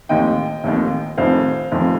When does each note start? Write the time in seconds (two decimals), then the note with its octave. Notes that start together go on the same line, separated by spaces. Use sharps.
0.09 F1 D#2 D#3 D#5 G5
0.64 F1 D#2 D#3
1.17 F1 F2 D#3 C5 F5
1.72 F1 F2 D#3